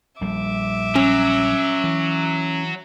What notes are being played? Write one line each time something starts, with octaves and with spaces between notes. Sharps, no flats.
A#1 G3 E5 D6
F#3 C#4
E3